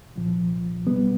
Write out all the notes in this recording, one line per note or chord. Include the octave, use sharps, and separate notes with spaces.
C2 A#2 F3
B2 G3 B3